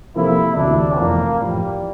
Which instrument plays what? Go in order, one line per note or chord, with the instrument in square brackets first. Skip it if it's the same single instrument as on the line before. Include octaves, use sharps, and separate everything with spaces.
[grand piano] C3 F3 A#3 F4 A4 [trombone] E4
[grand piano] D2 C3 E3 [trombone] D4
[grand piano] F1 F2 E3 [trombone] A#3
[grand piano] A1 A2 F3 [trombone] G3